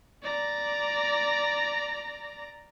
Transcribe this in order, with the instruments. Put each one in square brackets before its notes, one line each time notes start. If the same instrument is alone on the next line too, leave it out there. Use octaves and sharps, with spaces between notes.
[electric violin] D5 A#5